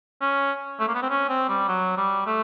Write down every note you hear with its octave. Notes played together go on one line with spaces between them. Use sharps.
C#4
A3
A#3
B3
C4
C#4
C4
G3
F#3
G3
A3